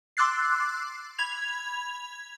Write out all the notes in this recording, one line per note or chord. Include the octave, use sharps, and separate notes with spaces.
C6 D6 E6 F#6 A6 C7
B5 G#6 F7